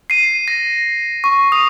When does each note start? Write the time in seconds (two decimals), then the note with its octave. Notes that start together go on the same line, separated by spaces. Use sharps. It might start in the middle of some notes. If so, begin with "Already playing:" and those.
0.10 C7 D#7
0.48 A#6
1.24 C#6
1.52 D#6